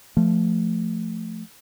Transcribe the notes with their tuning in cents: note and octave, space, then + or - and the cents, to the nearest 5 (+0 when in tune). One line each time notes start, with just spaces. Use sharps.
F3 -5 A3 +0